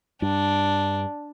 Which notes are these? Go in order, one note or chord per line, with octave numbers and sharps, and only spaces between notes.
G2 D4